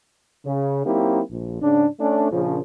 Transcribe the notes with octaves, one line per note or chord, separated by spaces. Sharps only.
C#3
F#3 A#3 C4 D#4 E4 G4
A#1
G#2 C#3 C#4 D4
A3 C#4 D4
A#1 C#3 F3